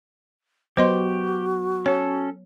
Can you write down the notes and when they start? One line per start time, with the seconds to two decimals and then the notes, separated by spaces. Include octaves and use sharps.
0.77 F#3 B3 F#4 G4 C5 D#5 C6
1.86 C#4 A4 C#5